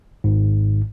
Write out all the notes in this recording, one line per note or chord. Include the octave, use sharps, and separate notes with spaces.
G#1 G#2